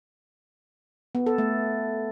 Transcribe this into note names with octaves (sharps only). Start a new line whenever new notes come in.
B3
A4
A3